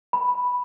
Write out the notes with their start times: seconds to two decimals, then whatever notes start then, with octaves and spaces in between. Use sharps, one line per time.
0.13 B5